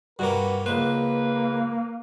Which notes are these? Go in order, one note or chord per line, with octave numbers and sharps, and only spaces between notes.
G2 C3 A#3 F#4 B4
C#2 A#3 B4 C5